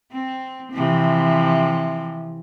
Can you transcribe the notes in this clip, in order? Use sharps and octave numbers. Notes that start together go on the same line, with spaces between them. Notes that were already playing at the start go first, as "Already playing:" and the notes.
C4
C3 E3 F3